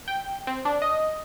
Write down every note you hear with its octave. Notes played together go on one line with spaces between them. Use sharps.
G5
C4
D4
D#5